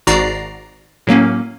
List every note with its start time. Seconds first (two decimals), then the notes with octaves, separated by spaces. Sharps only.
0.07 G#1 G#2 F#4 D5 A#5 C7
1.07 A2 F#3 A#3 C#4